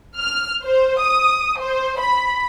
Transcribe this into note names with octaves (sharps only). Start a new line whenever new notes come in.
F6
C5
D#6
C5
B5